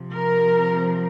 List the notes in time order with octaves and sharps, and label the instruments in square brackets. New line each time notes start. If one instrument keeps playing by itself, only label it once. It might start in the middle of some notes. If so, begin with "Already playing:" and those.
Already playing: [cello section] C3 F3
A#4